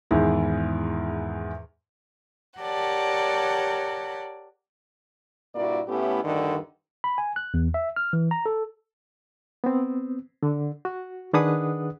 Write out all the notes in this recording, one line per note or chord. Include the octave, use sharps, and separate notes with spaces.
E2 G#2 D#3 E4 G#4
G4 A#4 C#5 D5 F#5 A5
G2 A#2 A#3 E4 F#4 D5
A2 A3 B3 C#4 E4 G4
D2 G2 D3 D#3
B5
G#5
F#6
E2
E5
F6
E3
A#5
A4
B3 C4
D3
F#4
D#3 D4 G#4 B4 F#5 D#6